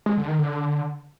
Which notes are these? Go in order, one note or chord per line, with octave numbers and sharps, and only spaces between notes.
G#3
D3
D#3
D3